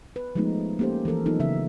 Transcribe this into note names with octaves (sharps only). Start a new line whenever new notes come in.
B4
F3 G#3 A3 B3 D#4
A#3 C#4 G4 A4 C5
E3 F3 A4 A#4
E3 F#3 B3 D#4 F4 A4
C#3 E3 D#4 E5